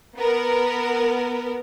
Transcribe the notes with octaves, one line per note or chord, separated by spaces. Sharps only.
B3 A#4